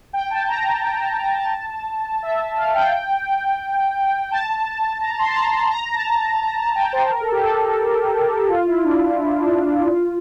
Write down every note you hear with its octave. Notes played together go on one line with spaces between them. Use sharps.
G5
A5
A#5
A5
G5
A5
A#5
A5
E5
E5
F5
G5
A5
A#5
C6
A5
A#5
A5
A#5
A5
A#5
A5
G5
C5
A#4
A4
G4
A4
F4
E4
D4
D4
E4
D4
F4